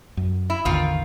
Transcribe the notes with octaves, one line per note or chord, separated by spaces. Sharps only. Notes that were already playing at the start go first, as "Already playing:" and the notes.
F#2
E4
A1 E2 D3 D#3 F4